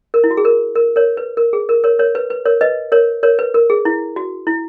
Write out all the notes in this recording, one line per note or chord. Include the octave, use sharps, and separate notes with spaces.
A#4
E4
F#4
G#4
A#4
A#4
A#4 C#5
B4
A#4
G#4
A#4
A#4 C#5
A#4 C#5
B4
B4
A#4 C#5
B4 D#5
A#4 C#5
A#4 C#5
B4
A#4
G#4
E4
F#4
E4